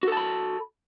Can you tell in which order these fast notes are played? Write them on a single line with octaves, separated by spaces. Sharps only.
F#4 A4 A5 B5